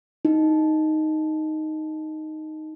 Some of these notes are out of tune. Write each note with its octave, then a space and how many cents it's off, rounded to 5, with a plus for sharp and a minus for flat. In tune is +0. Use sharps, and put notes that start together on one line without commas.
D#4 +0